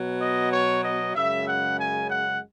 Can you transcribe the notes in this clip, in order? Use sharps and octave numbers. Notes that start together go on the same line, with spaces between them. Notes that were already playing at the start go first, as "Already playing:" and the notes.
Already playing: B2 F#3 B3
D#5
C#5
D#5
F#2 C#3 G#3 E5
F#5
G#5
F#5